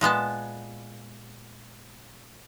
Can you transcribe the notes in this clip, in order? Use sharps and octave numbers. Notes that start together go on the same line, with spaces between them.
A#2 G#3 B3 A5